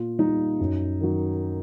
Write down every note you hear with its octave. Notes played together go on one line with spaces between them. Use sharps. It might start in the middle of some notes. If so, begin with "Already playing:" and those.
Already playing: A#2 F4
G3 D#4
F#2
D#3 F#3